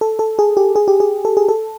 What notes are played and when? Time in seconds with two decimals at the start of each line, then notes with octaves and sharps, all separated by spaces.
0.01 A4
0.19 A4
0.39 G#4
0.57 G4
0.76 G#4
0.88 G4
1.00 G#4
1.25 A4
1.37 G#4
1.49 A4